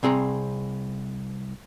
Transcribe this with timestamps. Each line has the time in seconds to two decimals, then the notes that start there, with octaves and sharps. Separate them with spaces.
0.03 C2 C4 G#4 A#5